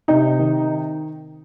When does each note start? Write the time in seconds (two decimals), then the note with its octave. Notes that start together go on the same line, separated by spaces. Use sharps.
0.08 C3 D#4
0.39 D#3